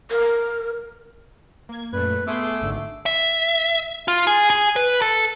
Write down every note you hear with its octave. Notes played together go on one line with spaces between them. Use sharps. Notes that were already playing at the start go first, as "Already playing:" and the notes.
A#4
A#3 G#6
F#2 A#2 A3 B4
A3 B3 G#4 C6 D6 E6
G#1 G#2 D3
E5
F4
G#4
G#4
B4
A4